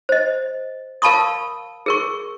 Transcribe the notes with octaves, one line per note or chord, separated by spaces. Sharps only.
C5 D#5
A#4 F5 A5 B5 C#6 D#6
G#4 A#4 C#6